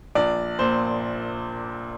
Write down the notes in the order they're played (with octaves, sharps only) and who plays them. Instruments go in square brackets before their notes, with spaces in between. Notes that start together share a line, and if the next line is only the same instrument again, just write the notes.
[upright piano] A#1 D5
A#2 C5